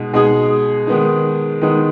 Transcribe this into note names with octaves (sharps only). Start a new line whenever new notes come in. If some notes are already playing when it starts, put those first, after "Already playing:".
Already playing: B2 G#3 D#4
B2 G#3 D#4 G#4
D#3 G#3 B3 D#4
D#3 G#3 B3 D#4